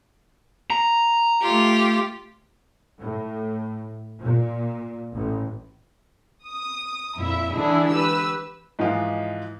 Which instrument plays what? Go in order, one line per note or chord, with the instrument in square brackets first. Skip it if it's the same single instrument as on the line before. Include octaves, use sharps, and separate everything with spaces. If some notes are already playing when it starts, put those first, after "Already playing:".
[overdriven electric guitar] A#5
[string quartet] A3 F4 G4
[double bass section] A2
A#2
A1
[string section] D#6
F2 A#2 E4 E5
D3 E3 G#3 D4 E4 G#4
G4 B4 E6
[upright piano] G#2 E3 F3 G#3 F4